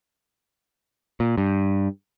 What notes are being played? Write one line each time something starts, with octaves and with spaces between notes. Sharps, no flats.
A#2
G2